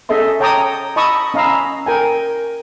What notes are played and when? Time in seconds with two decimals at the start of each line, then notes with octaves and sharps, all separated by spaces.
0.09 C#4 G#4 A4 D#5 E5 C6
0.40 C#5 G5 A5 A#5 D6 D#6
0.96 D#5 A5 B5 C#6 D#6 E6
1.34 C#4 D#5 F5 A#5 B5 E6
1.86 A#4 G5 G#5